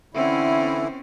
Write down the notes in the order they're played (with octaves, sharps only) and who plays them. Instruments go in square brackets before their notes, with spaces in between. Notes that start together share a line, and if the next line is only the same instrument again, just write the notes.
[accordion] D3 E3 E4 [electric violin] C4 C#4